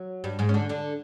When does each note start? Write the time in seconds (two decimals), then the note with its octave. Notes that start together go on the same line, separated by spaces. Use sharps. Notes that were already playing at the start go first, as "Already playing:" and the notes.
Already playing: F#3
0.24 G2 G3
0.39 G#2 G#3
0.49 C#4
0.54 D3 D4
0.69 D3 D4